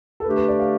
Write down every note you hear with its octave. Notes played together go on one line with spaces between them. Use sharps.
A4
D3 A3 D4 G4 B4
B4
D5
F5